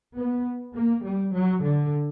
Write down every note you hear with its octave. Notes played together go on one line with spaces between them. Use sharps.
B3
A#3
G3
F#3
D3